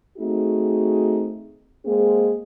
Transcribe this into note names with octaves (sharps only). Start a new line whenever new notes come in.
A3 C4 D#4 F#4 G#4
G#3 A#3 C4 G#4